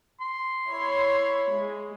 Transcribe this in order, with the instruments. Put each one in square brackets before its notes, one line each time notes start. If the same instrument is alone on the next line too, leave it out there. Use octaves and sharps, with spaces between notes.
[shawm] C6
[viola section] E4 C#5 B5
G#3